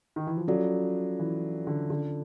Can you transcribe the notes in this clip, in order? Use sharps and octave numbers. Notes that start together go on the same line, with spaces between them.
D#3
E3
F3
F#3 C#4 F4 A4 D5
E3
D3
D3